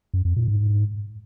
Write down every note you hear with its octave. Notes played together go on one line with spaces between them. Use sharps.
F#2
F2
A#2
G#2